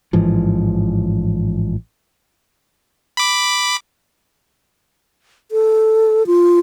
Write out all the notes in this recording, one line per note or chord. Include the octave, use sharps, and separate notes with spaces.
A1 G#2 E3 F3
B5 D6
A4
F4